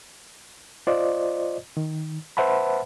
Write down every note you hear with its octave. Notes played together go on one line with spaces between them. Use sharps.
F4 C5 D5 D#5
D#3
B4 C5 E5 F#5 A5 B5